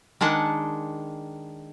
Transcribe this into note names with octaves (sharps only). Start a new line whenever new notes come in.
D#3 G#3 D4 F#5 A5